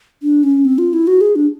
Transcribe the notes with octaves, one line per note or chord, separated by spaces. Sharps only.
D4
C#4
C4
F4
E4
F#4
G#4
D4